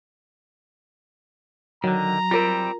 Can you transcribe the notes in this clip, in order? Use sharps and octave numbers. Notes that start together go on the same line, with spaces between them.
D3 D#3 F#3 A#5
G3 C4 F4 A#4